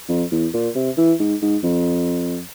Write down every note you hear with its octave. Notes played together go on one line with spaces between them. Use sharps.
F2
E2
A#2
C3
E3
G#2
G#2
F2